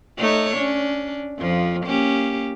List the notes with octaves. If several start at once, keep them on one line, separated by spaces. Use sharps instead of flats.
A3 D#4 C#5
C#4 D4
F2 F3
A#3 C#4 G4